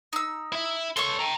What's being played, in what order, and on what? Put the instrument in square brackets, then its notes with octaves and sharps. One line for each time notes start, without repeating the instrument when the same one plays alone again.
[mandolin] D#4 E6
[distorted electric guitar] E4 E5
[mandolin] A4 C#6 [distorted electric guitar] C#5 C6
[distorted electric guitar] G5 A#5